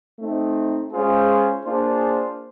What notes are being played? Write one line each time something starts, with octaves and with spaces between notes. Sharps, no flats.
A3 C4 D#4
G#3 C#4 F4 G#4 C5
A#3 D4 F4 G#4 C5